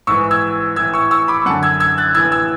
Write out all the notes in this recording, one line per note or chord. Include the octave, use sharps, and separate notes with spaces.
G#2 E3 C#6 E6
E6 G#6
A2 E3 E6 G#6
C#6 E6
C#6 E6
B5 D6
F#2 D3 F#5 A5
E6 G#6
E6 G#6
F#6 A6
A2 E3 E6 G#6
E6 G#6